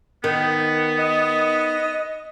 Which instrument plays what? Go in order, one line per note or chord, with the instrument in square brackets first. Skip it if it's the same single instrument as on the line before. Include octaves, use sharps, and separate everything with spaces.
[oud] D#3 [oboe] B3
[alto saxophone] D#5